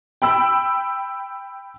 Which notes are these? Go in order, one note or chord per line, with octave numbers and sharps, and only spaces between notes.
G5 B5 E6